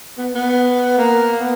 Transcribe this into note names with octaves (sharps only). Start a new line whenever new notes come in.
B3
B3
A#3
B3